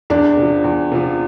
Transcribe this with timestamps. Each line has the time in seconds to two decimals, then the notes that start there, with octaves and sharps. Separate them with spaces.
0.10 E2 D4
0.37 C3 F3
0.64 E2
0.92 C3 F3